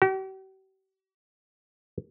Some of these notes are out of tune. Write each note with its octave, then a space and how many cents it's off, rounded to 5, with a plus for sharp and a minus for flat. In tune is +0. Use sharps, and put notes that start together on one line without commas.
G4 -45